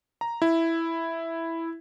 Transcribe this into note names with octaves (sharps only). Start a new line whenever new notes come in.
A#5
E4